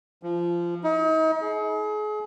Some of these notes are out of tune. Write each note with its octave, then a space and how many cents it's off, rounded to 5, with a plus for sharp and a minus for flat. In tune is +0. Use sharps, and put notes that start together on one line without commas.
F3 -15
D#4 +40
G#4 +35